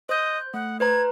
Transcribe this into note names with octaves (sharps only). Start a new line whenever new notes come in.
C5 D#5 G6
A3 F#5
B4 C5 A#5 G#6